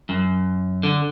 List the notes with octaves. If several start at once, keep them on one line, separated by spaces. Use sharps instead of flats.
F#2
D3